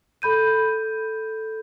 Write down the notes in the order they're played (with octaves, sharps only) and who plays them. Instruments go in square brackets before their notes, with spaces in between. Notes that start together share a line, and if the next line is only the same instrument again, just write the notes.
[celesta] A4 B5 G6 D#7